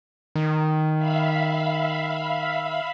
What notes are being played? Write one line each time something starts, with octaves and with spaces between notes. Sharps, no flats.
D#3
E5 F5 B5